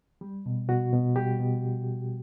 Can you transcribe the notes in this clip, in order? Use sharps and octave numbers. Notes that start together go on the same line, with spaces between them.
G3
B2
B2 F#4
B2
G3 G4
B2